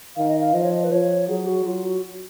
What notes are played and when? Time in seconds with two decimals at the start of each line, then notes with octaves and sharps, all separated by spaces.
0.16 D#3 F5
0.28 D#5
0.40 F5
0.54 F3 D#5
0.64 C#5
0.72 D#5
0.84 B4
0.92 F3 C#5
1.28 F#3 G#4
1.47 F#4
1.65 F#3 F4
1.84 F#4